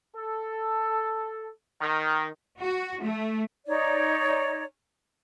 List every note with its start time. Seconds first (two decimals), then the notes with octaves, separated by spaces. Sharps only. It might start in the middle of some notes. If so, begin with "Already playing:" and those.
0.15 A4
1.81 D#3
2.60 F#4
3.02 A3
3.67 D#4 C#5 D5